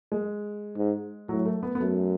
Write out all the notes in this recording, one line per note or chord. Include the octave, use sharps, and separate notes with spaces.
G#3
G#2
A2 F#3
A3
B3
B3
F#2 A3